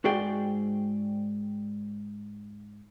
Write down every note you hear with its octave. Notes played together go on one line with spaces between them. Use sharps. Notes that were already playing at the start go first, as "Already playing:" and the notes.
G#2 F#4 G#4 D5 G5